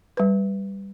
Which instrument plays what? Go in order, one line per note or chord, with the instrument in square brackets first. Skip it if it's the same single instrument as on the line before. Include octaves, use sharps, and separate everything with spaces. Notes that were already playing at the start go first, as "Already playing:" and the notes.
[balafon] G3 B4